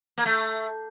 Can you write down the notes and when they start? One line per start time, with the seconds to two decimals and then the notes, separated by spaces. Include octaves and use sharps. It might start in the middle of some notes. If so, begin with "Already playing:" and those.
0.18 A#3
0.25 A3